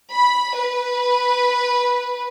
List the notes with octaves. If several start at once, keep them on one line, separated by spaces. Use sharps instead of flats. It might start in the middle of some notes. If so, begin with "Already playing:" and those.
B5
B4